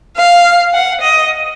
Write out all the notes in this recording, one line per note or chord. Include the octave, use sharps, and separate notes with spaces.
F5
F#5
D#5